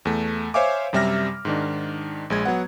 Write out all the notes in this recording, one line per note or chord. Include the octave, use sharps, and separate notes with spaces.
E2 A3
C5 C#5 E5 F5 G#5 D6
F#2 C3 G3 E5 F6 A#6
G#2 D#3 D4
A#1 G#3 G#6
F#3 B3 F#5